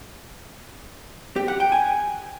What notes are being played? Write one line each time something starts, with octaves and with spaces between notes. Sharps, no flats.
G4
F#5
G5
G#5